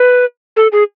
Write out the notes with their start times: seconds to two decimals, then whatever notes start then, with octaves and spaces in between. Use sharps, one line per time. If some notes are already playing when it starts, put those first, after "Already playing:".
Already playing: B4
0.56 A4
0.72 G#4